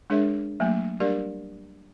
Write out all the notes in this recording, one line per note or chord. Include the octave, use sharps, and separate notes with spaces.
G#3 D4 G#4 A#4 C#5 E5
F#3 A3 A#3
G3 D4 G4 A#4 D5